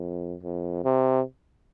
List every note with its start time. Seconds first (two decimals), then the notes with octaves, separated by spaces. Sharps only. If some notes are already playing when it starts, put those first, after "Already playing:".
Already playing: F2
0.43 F2
0.84 C3